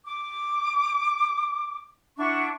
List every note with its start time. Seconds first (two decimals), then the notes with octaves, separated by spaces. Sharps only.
0.04 D6
2.16 D4 E4 F#5 C#6